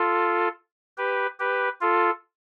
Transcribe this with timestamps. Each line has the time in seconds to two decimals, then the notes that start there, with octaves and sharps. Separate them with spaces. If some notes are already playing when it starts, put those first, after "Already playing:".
Already playing: F4 A4
0.97 G4 B4
1.39 G4 B4
1.81 F4 A4